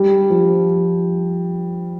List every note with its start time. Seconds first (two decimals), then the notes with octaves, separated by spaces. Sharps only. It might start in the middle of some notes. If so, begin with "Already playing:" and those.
Already playing: G3
0.30 F3